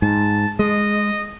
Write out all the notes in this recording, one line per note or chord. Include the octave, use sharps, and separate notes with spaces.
G#2 A5
G#3 D#5